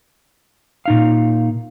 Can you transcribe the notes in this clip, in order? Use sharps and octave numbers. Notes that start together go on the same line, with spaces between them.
A#2 D#4 F5